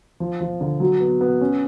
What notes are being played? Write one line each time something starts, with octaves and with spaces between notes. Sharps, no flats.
F3
F3
D3
F#3
B3
B3
C#4